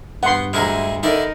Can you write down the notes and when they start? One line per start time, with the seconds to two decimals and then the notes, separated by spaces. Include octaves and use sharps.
0.23 G2 B3 F#5 C6
0.53 D2 G#3 E4 G#4 A#5
1.03 D3 D#4 E4 A#4 D5